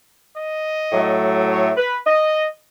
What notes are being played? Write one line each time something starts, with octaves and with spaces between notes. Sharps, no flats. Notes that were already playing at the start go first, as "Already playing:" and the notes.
D#5
A2 F#3 A3
C#5
B4
D#5